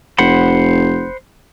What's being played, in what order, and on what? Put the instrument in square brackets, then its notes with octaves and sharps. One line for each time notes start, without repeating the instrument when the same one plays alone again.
[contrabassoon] F1 [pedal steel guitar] C5 F#5 B5